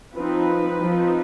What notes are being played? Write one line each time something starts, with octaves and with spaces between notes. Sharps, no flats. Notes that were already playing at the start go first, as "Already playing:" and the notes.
F3 C4 D#4 B4
F3 C4 D#4